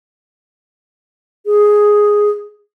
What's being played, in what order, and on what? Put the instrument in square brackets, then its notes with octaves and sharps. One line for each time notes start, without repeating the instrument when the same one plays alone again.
[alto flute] G#4